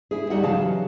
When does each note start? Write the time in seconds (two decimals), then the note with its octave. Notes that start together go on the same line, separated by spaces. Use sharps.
0.11 E4 G#4
0.30 G3 D#4 F#4 G4 E5 F#5
0.43 C#3 E3 F#3 G#4 F5 A5